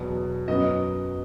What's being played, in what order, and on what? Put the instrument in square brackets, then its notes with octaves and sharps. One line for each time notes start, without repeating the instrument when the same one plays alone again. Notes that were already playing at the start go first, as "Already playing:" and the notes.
Already playing: [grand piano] E2 B2 F#3 B3
F#2 F#3 B3 D#4 D#5